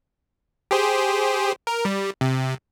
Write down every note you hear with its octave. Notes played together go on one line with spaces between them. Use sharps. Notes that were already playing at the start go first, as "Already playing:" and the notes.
G4 G#4 C5
A#4
G3
C3